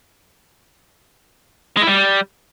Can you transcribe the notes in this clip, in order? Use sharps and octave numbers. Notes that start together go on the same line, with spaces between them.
G#3
E4
G3